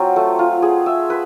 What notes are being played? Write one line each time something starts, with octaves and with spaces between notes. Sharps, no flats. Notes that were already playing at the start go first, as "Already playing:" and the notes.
Already playing: F#3 C4 F4
A3
F4
G#4
E5
B4